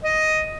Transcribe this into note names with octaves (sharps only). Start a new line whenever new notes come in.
D#5